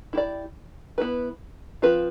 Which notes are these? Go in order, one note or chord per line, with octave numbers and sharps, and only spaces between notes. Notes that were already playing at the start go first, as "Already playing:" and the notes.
E4 G4 D5
B3 E4 B4
F3 C4 F4 B4